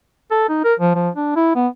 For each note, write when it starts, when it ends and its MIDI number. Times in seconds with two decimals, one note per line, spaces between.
0.31 0.46 69
0.49 0.60 63
0.64 0.74 70
0.79 0.93 53
0.95 1.09 53
1.15 1.33 62
1.36 1.54 64
1.55 1.67 59